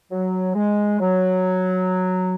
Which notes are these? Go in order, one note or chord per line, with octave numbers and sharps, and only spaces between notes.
F#3
G#3
F#3